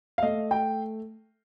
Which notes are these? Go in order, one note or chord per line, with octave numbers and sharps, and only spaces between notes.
F5
A3 D#5
G5